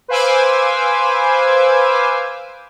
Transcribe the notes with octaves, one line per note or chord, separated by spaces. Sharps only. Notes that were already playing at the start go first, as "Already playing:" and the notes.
B4 C5 F5 G#5 D6 E6